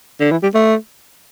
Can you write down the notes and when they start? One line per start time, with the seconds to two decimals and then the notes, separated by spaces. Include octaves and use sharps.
0.20 D3
0.31 E3
0.43 G3
0.54 A3